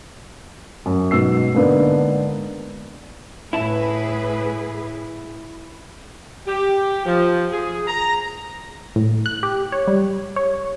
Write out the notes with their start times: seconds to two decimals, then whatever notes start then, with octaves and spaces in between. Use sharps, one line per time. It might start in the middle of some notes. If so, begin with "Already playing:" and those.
0.86 F#2
1.11 G#2 B2 E6 C7
1.55 G#2 D3 A#3 B3 D4
3.53 A2 E4 G#4 B4 A5
6.48 G4
7.06 F3
7.52 G#4
7.88 A#5
8.96 A2
9.26 F#6
9.43 G4
9.72 C#5
9.88 G3
10.36 C#5